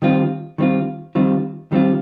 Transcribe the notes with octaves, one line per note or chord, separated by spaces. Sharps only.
D#3 G3 C4 F4
D#3 G3 C4 F4
D#3 G3 C4 F4
D#3 G3 C4 F4